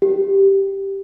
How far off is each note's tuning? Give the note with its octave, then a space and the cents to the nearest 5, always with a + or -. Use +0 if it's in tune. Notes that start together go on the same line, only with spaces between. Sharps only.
G4 -5